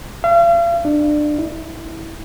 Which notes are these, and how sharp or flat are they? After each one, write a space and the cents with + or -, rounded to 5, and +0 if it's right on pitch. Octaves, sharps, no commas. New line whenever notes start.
F5 -40
D4 +25
E4 -15